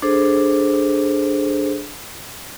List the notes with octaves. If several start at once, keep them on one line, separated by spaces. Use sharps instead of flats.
D4 G#4 A4 C5